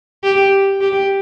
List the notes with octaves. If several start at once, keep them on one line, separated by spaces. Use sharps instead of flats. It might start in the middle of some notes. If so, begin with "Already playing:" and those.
G4
G4